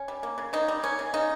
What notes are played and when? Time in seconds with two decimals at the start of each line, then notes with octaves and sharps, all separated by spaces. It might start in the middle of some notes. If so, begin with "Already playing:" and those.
Already playing: C#4
0.08 G3
0.23 A#3
0.38 C#3
0.53 C#3 D#4
0.68 G3
0.83 A#3 C#4
0.99 C#3
1.14 C#3 D#4